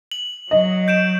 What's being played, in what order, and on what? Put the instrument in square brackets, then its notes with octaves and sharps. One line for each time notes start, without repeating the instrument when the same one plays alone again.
[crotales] F#7
[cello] F#3 [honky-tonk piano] D#5
[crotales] G6 D7 E7